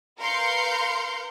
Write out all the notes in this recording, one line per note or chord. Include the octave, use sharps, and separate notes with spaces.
A#4 B4 F5 C6 G6 C#7